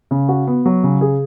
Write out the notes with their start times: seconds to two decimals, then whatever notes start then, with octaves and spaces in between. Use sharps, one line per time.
0.11 C#3
0.29 F#4
0.47 B3
0.66 F#3
0.84 C#3
1.01 G#4